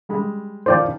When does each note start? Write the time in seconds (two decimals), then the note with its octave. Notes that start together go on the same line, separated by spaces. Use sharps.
0.09 G3 G#3 B5
0.66 D#3 F3 F4 C5 D5 G5